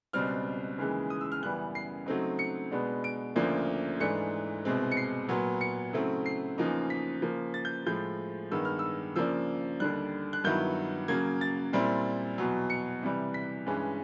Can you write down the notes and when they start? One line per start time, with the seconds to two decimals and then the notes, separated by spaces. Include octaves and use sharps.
0.13 C#2 B2 G3 C4 F6
0.78 D#2 C#3 E3 G#3
1.10 D#6
1.21 E6
1.32 F6
1.42 F#2 C#3 E3 G3 B3 F#6
1.75 C7
2.06 C#3 F#3 A3 C4 D#4
2.39 C#7
2.71 B2 G#3 B3 D4
3.04 D7
3.36 D2 C#3 F3 A#3 D4
4.00 G#2 E3 A3 D4 C#7
4.65 C2 B2 G#3 C4
4.92 C#7
4.97 C7
5.29 A#2 F#3 B3
5.61 C#7
5.93 C#3 F#3 A3 C4 E4
6.26 C7
6.58 E2 C#3 F3 A#3 D#4
6.90 B6
7.22 C#3 F3 A#3
7.54 A6
7.65 G6
7.86 A2 F3 G#3 G6
8.51 G2 D#3 G#3 B3 E6
8.65 F6
8.79 E6
9.16 C#3 F3 A#3 D4 E6
9.80 D#2 D3 G3 F#6
10.33 F#6
10.44 G2 D#3 F#3 B3 E4 G6
11.08 C#3 F#3 A#3 G#6
11.41 A6
11.73 A#2 G3 C4 E4
12.38 E2 B2 F#3
12.70 C#7
13.03 C3 E3 G3
13.34 B6
13.66 G2 E3 G#3 C#4